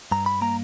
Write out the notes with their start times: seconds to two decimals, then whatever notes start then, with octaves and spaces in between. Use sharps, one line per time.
0.11 G2 A#5
0.26 B5
0.41 A#3 A#5